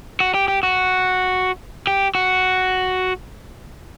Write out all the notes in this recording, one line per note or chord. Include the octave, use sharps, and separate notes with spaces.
F#4
G4
G4
F#4
G4
F#4